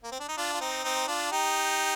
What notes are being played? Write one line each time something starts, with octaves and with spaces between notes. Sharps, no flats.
A#3
C4
D4
D#4
D4 F4
F4
C4 D#4
C4 D#4
D4 F4
D#4 G4